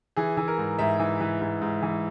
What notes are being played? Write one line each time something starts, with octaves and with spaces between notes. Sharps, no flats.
E3 G#4
E3
A#4
G#2
G#2 E5
E3
E3
G#2
G#2
E3